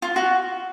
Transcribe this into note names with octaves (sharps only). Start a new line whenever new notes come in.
F4
F#4